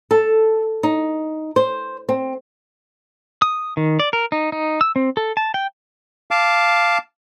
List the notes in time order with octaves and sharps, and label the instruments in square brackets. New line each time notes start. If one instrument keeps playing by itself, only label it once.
[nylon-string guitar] A4
D#4
C5
C4
[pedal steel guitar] D#6
D#3
D5
A#4
D#4
D#4
E6
C4
A4
A5
G5
[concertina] F5 A5 D6